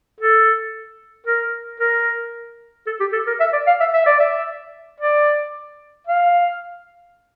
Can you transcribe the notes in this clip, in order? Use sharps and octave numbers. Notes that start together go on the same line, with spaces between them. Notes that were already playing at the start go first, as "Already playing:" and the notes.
A4
A#4
A#4
A4
G4
A4
A#4
E5
D5
F5
E5
E5
D5
E5
D5
F5